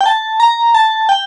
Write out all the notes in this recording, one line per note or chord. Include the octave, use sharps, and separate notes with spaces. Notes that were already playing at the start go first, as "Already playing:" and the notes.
G5
A5
A#5
A5
G5